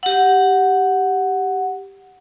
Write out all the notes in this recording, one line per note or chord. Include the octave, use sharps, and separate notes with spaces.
G4 F#5